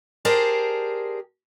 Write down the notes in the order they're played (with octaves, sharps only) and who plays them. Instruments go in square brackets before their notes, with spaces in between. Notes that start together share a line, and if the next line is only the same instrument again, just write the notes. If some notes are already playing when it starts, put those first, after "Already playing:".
[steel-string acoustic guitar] G4 G#4 A#4 C5 D5 A5